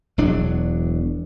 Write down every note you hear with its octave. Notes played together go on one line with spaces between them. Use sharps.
E1 E2 F#3 D4